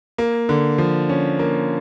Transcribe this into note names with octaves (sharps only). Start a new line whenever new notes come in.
A#3
D3
F3
C#4
A#3